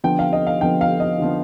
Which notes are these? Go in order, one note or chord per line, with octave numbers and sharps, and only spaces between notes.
D3 F3 B3 G5
F5
D#5
F5
D3 F3 B3 G5
F5
D#5
D3 F3 B3